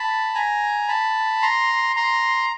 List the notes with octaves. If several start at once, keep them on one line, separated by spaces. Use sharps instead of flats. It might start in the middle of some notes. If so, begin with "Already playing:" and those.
Already playing: A5 B5
G#5 A#5
A5 B5
A#5 C6
A#5 C6